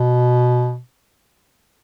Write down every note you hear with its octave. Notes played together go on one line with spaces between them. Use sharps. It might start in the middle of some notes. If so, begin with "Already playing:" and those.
Already playing: B2